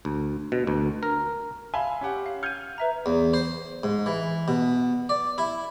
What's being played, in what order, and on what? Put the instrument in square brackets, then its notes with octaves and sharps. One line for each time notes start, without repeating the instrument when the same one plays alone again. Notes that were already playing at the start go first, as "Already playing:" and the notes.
[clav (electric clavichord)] D2
B2
D2
A#4
[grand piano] E5 F5 G#5 [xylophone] B5 C6
[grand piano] C#4 G4 F#5
[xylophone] F5
[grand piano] F6 G6 G#6 [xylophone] C#7 D#7
[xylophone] B4 E5 A#5
[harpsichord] E2
C5
G#2
E3
B2
D5
E4